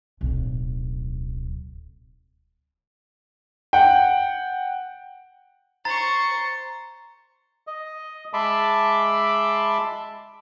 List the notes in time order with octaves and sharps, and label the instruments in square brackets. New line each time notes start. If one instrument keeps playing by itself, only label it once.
[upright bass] D1 B1
[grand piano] F#5 G5
[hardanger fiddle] C5 C#6 [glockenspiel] A#5 A6
[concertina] D#5
G#3 E5 A5 B5 C6 D6